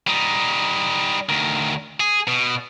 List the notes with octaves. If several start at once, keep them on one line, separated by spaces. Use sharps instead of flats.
G3 D#4
D2 D#3
G#4
B2